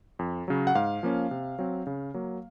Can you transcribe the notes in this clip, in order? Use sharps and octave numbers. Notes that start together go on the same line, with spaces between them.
F2
C#3 F#3
F#5
G#2 F5
F3 A#3 C#4
C3
F#3 C4
C#3
F#3 A#3